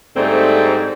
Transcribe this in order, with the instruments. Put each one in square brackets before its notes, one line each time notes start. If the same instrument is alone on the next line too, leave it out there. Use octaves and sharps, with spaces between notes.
[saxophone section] G#2 D3 G3 A3 C4